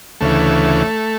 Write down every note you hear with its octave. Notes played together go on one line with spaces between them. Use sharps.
D2 C#3 E3 A3